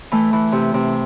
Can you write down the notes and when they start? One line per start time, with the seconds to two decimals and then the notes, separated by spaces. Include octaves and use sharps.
0.12 E3 A3
0.33 E3
0.52 C3
0.74 C3